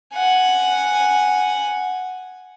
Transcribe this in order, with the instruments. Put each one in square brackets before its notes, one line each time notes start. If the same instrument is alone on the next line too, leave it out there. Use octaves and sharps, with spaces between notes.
[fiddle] F#5 G#5